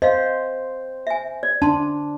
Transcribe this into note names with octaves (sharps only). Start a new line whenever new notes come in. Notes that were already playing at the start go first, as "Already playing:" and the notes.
C5 D#5 F5
E5 G#5
D5
D4 A5 C6